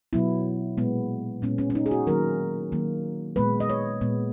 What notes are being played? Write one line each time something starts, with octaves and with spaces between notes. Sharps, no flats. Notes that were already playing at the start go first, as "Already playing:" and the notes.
B2 F#3 B3 E4
A#2 G#3 B3
A#2 G#3 B3 C#4
C#4
C#4
D#4
G#4
F#4
D#3 F#3 A#3 A#4
D#3 F#3 A#3
A#2 G#3 B3 B4
D#5
C#5
A#2 G#3 B3